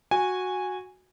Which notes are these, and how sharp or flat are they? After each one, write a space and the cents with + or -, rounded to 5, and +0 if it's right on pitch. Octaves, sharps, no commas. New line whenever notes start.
F#4 -10 G#5 -10